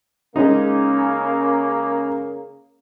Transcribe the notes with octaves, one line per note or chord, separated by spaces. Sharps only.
C#3 G#3 A#3 C#4 D#4